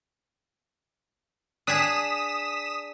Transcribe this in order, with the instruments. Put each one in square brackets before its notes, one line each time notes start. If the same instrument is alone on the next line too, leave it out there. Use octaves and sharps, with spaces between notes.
[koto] D4 G#4 [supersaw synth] D#6 B6 E7